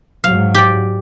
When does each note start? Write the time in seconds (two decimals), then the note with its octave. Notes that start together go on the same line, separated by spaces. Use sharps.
0.24 G#2 F#3 F5
0.54 G4 D5